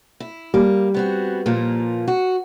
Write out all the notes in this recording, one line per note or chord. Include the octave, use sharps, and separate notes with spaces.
E4
G3 A#3
B3 C4 F#4
A#2 F3 A#3
F#4